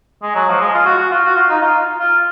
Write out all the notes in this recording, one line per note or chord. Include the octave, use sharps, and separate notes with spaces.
G#3
F#3
F3
G#3
F4
F#4
F#4
F4
F#4
F4
D#4
F4
F4